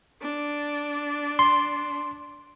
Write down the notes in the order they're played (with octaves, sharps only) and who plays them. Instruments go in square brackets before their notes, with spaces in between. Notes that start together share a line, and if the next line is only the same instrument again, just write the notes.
[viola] D4
[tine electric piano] C6